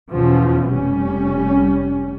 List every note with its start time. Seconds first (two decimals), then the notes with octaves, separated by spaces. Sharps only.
0.12 E2 B2 E3 F3 C#4
0.69 F1 G3 C#4